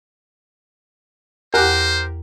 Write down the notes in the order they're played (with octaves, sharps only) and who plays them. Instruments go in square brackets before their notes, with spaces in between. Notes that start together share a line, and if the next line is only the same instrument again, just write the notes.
[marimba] E2 F#5 F#6 [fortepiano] G4 A#4 [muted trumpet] C5